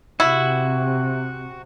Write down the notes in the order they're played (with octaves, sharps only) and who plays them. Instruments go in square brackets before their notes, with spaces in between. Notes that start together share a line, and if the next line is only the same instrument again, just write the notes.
[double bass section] C3 [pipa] E4 [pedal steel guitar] F#4